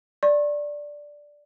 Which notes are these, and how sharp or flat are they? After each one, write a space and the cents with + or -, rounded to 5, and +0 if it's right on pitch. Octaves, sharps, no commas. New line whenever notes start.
D5 +0 C#6 -40